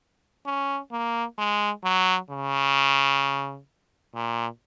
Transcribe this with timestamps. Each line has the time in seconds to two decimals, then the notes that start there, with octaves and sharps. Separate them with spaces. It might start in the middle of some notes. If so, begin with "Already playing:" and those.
0.46 C#4
0.92 A#3
1.38 G#3
1.84 F#3
2.30 C#3
4.14 A#2